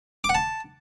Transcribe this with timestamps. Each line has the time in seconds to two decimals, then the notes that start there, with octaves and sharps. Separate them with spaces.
0.24 D6
0.29 F#5
0.35 A5